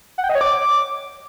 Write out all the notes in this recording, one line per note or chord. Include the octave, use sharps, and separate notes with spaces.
F#5
G5
D#5
C#5
D6